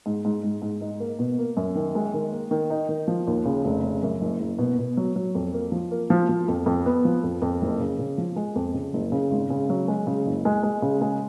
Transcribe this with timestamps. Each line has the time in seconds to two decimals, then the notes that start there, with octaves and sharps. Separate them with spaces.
0.06 G#2
0.25 G#2
0.43 G#2
0.62 G#2
0.81 D#4
1.00 A#3
1.19 B2
1.38 A#3
1.57 F#2
1.75 D#3
1.95 G#3
2.14 D#3
2.32 A#3
2.51 D#3
2.70 D#4
2.89 D#3
3.08 F3
3.27 D#2
3.45 C#3
3.65 F1
3.84 C#3
4.03 F#2
4.21 F#1
4.40 F#1
4.58 B2
4.78 B2
4.97 F#3
5.16 F#3
5.35 F2
5.54 A#3
5.72 F3
5.91 A#3
6.10 F3
6.29 F3
6.48 F2
6.66 F2
6.86 B3
7.05 F3
7.23 F2
7.42 F2
7.62 F#1
7.80 C#3
7.99 C#3
8.18 F3
8.36 G#3
8.55 F2
8.74 C#3
8.93 F#1
9.12 C#3
9.31 G#1
9.50 C#3
9.70 F#3
9.88 G#3
10.07 C#3
10.26 F#1
10.45 G#3
10.63 G#3
10.82 C#3
11.01 G#3